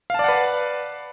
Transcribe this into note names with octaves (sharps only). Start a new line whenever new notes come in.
B4 D5 F5 F#5 A5